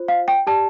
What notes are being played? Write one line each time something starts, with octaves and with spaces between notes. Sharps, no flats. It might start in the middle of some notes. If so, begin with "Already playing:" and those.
Already playing: F4 C5
F5
G5
G4 D5 A5